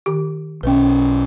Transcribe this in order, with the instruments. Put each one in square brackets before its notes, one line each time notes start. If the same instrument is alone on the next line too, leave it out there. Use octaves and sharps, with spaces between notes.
[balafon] D#3 G4
[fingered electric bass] B1 C#4 [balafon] B4 G5